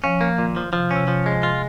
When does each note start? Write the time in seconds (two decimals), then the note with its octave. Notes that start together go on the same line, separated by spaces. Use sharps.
0.04 F3 C#4
0.21 A#3
0.38 A#2 D#3
0.56 F3
0.73 C3 F3
0.91 C#4
0.96 C3
1.08 F3
1.26 G#3
1.43 F4